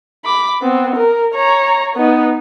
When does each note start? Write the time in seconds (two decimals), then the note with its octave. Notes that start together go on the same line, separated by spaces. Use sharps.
0.25 B5 D6
0.62 B3 C4
0.96 A#4
1.34 C#5 A#5
1.96 B3 D#4